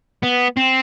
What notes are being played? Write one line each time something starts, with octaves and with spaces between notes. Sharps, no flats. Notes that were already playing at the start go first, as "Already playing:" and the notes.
B3
C4